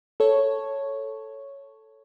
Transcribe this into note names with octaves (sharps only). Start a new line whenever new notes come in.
A4 C#5